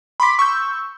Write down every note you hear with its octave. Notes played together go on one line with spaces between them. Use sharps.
B5 C6 D6 B6
C#6 E6 G6